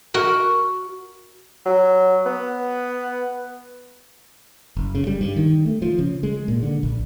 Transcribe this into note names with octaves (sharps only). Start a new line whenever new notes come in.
F#4 A#4
F#3
B3
F#1
C#3
G3
G2
D#3
A3
F3
C#3
G#3
A#2
D3
A#1